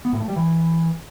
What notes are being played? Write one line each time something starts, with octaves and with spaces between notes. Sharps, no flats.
B3
A2
A3
G3
E3